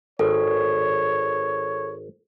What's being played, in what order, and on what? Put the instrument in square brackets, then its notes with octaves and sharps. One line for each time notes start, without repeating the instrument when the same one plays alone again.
[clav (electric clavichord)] G#1 [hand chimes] A4 [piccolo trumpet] C#5